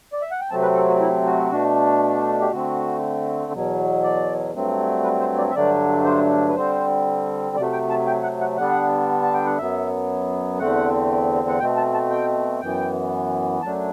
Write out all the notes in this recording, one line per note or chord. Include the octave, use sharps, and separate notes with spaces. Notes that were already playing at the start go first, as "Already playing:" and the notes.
D5
E5
F#5
G5
C3 F#3 A3 C4 A5
B4
A4
F#4
E4
F#4
B2 A3 D4
G4
D3 A3 C4 F#4
E2 B2 F#3
D5
G2 F#3 A3 C4
B4
C5
D5
E5
G2 D3 F#3 A3 D4 D5
C5
B4
D3 G3 C4 C5
C3 F#3 A3 D5
G5
A5
G5
F#5
F#5
D3 G3 B3 D4 F#5
A5
G5
F#5
F#2 F#3 B3 E5
E2 D3 A3 C4 F#5
F#5
B2 A3 C4 G5
A5
A5
G5
F#2 E3 B3 G5
F#2 F#3 A3 D4 A5